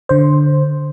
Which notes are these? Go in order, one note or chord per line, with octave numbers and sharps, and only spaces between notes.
D3 C5